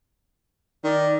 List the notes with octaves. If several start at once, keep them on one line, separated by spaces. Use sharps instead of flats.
D#3 D5